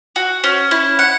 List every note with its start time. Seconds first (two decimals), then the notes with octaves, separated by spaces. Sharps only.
0.16 F#4
0.44 C#4
0.71 E4
0.99 F#5